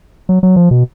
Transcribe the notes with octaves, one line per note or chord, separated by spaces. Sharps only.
F#3
F#3
F3
B2